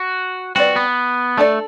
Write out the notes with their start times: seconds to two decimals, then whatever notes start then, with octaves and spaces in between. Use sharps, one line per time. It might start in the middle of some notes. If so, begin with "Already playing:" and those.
Already playing: F#4
0.55 G3 C4 E4 F#4 B4 D5
0.76 B3
1.38 A3 D4 A4 D5